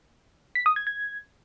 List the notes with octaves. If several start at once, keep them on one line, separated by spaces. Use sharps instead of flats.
B6
D#6
G#6
G#6